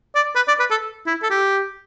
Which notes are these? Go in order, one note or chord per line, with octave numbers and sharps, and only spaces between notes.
D5
B4
D5
B4
A4
E4
A4
G4